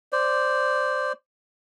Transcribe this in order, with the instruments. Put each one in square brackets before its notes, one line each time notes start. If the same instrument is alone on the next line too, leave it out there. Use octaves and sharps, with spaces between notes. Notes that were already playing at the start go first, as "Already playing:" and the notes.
[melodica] C5 D5